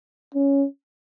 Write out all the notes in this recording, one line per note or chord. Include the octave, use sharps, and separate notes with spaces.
C#4